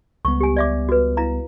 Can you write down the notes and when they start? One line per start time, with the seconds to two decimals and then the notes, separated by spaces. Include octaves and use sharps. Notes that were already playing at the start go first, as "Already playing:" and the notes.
0.25 C#2 G3 B3 C#6
0.40 G4 G#5
0.56 D5 E5 D6
0.89 F#4 B4
1.17 E4 F5 A#5